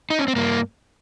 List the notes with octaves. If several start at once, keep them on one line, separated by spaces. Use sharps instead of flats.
D#4
C#4
C4
G2 A#3